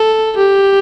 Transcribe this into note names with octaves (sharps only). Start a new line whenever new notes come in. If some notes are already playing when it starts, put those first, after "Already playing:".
Already playing: A4
G4